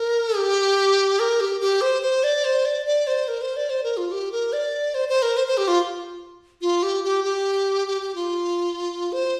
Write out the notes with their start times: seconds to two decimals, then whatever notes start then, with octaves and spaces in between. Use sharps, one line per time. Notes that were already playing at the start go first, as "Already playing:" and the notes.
Already playing: A#4
0.36 G4
1.19 A#4
1.40 G4
1.61 G4
1.81 C5
2.02 C5
2.23 D5
2.44 C5
2.65 D5
2.86 D5
3.07 C5
3.28 A#4
3.42 C5
3.56 D5
3.70 C5
3.83 A#4
3.97 F4
4.11 G4
4.32 A#4
4.53 D5
4.94 C5
5.09 C5
5.22 A#4
5.37 C5
5.47 C5
5.57 G4
5.68 F4
6.61 F4
6.83 G4
7.04 G4
7.24 G4
7.87 G4
8.01 G4
8.15 F4
9.12 C5